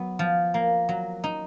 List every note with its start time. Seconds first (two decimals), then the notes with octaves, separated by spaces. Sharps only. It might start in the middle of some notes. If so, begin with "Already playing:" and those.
Already playing: F#3 B3
0.19 F3
0.54 A#3
0.89 F#3
1.24 D#4